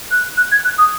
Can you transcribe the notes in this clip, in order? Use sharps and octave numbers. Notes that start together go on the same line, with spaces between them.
F#6
F#6
G#6
F#6
D#6